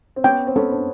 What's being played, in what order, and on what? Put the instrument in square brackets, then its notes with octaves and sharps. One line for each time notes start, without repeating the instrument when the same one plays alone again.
[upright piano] C4
[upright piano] B3 C#4 [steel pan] G5
[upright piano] C4
[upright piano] B3 C#4 [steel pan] A4
[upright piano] C4 D4